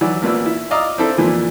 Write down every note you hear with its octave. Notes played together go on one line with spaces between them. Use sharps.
E3 F#3 D5
A1 A#2 B4 E6
E4
D5 D#5 F5 A#5 D6 E6
C4 D4 E4 A4 C5
F2 A#2 E3